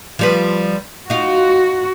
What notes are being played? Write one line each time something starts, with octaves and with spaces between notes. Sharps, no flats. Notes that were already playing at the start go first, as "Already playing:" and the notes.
F3 G3 B4
D#4 F4 F#4